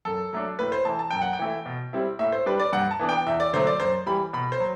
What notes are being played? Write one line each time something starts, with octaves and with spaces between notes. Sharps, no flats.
F#2 A4
F#3 A3 D4
A2 B4
C5
E3 A3 A5
A5
F#2 G5
F#5
G5
E3 A3 E4
B2
G3 C4 E4
A2 E5
C5
G3 D4 B4
D5
G2 F#5
A5
E3 B3 D4
G5
E2 E5
D5
D3 F#3 A3 C5
D5
F#2 C5
E3 G3 B5
B2 B5
C5
F#3